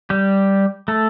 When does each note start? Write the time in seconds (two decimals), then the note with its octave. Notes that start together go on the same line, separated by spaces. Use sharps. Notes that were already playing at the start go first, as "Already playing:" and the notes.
0.10 G3 G4
0.88 A3 A4